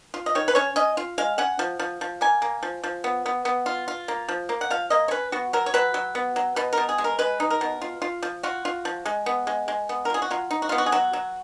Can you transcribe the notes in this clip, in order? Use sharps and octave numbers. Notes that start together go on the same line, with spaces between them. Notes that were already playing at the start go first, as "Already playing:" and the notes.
F4
D#5
D#3 C#5
B4
C#4 C#5
C#4 D#5
F4
G#3 F5
C#4 F#5
F3
F3
F3
A#3 G#5
A#3
F3
F3
B3
B3
B3
F4
F4
A#3
F3
A#3
F#5
F3 F5
A#3 D#5
C#5
C#4 B4
B3 F#4
F#3 A#4
C#5
F#3 B4
F#3
B3
F#3
B2 B4
B2 A#4
G#4
G#3
A#4
G#3 B4
D#4
A#4
B2
F4
F4
F3
F4 F#4
F4
F3
G#3
B3
G#3
G#3
B3
A#4
F4 G#4
F#4
F#3 F4
D#4
F#4
B3 F4
F#4
G#4
F#3 F#4
F#3